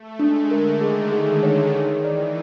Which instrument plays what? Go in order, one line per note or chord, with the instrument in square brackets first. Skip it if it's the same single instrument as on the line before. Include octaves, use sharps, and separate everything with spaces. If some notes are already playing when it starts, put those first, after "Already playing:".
Already playing: [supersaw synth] A3
[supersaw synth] G#3 [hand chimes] D4
[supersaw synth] D3 [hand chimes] A#4
[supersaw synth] D#3 [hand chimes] G#4
[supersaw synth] D#3 [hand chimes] G#4
[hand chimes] C#5
[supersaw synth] D#3 [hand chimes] G#4
[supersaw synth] E3 [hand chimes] D5